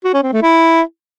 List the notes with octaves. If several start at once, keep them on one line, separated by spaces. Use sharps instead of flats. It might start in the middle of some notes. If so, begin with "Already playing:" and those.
F#4
C#4
C4
A3
E4